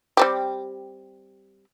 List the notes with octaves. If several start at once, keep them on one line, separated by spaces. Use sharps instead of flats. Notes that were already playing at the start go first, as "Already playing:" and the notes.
G3 C4 G4